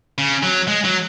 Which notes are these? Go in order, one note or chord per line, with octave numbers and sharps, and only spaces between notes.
C#3
F#3
G#3
F#3